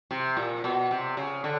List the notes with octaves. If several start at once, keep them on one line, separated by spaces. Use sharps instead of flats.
C3
A#2
B2
C3
C#3
D3